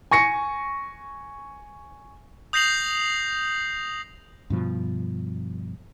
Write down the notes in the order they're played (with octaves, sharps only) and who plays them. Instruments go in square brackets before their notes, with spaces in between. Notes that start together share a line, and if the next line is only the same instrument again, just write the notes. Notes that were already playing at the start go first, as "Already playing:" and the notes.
[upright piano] G#5 C#6 A#6 C#7
[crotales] D#6 G6 A#6 C7 F7 F#7
[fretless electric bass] G2 B2 F3